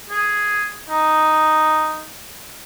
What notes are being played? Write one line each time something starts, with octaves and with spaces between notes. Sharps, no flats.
G#4
D#4